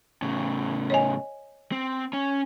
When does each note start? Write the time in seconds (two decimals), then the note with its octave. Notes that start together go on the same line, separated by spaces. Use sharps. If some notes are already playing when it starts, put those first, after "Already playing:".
0.22 A2 C#3
0.90 C#5 D#5 G#5
1.72 C4
2.13 C#4